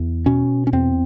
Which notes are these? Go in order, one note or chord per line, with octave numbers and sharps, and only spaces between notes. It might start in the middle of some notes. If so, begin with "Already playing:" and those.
Already playing: E2
B2 C#4
C#4
E2 C4